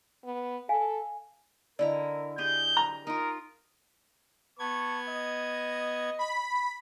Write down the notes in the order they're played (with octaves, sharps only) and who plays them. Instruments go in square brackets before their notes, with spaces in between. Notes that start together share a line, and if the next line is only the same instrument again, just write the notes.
[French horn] B3
[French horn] A4 [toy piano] F5 G#5
[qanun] D3 E4 A#5 [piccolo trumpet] A#4 [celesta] D5 D#5
[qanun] G4 G#4 [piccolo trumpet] G6
[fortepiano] A#5
[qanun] D#4 F4 [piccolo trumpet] A#4
[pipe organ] B3 G#6 [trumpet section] A5 C#6
[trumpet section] D#5
[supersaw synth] B5